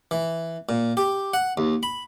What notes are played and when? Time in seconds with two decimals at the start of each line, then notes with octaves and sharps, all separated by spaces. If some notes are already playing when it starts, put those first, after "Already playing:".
0.11 E3
0.69 A#2
0.97 G4
1.34 F#5
1.57 D#2
1.83 B5